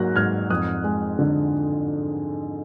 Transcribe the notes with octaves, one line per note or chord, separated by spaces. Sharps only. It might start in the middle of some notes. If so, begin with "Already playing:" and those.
Already playing: G#2 F#3 A#3 F#6 A#6
G#2 F6 G#6
F2 D#6 F#6
G#3
D3